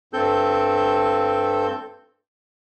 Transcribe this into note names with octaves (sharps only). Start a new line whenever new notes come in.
G2 C4 A4 G6